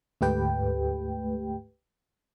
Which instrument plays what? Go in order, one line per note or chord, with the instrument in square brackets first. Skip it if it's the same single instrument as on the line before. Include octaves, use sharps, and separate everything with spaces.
[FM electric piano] D2 G#2 A3 G4 B4 G5